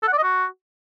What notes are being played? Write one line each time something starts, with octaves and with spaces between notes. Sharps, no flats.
A4
F#5
D5
D#5
F#4